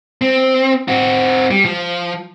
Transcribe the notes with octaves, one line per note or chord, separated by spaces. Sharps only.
C4
C4 F#4
G3
F3